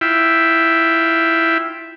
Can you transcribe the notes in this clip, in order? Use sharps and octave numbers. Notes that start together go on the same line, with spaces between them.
E4 F4 E5 G5